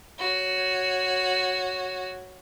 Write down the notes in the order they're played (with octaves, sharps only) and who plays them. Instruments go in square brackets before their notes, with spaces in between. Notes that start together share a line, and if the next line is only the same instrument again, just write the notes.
[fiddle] F#4 C#5